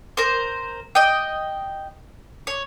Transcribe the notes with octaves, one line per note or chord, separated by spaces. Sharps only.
A#4 C5
D#5 G5
C#5